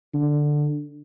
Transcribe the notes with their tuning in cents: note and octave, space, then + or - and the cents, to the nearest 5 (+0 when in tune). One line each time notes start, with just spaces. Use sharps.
D3 +5